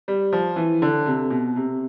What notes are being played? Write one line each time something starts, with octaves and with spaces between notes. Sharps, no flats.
G3
F3
E3
D3
C3
B2
C3